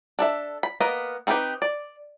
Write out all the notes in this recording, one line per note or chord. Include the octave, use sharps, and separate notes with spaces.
D4 A4 E5
B5
A#3 B3 A#4 B4 D#5
C4 D#4 E4 G4 B4
D5